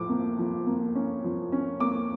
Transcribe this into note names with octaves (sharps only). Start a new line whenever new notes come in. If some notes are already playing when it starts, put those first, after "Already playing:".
Already playing: A2 F3 D6
A#3
F3
A#3
C#4
F3
C#4
A#3 D6